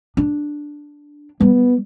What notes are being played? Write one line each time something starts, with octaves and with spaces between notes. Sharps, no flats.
D4
G3 B3